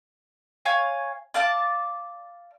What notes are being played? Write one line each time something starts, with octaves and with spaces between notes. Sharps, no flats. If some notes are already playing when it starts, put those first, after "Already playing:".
C#5 F5 G#5
D5 F5 A5 D6